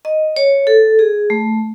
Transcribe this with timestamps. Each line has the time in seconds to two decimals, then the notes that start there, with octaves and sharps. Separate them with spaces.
0.05 D#5
0.36 C#5
0.67 A4
0.99 G#4
1.30 A3